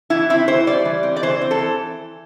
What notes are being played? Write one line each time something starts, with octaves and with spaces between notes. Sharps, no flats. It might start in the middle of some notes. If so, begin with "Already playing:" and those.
E3 E4
C4 E4
E3 C5
G3 D5
E3
C4
D5
E3 C5
C4
A4
E3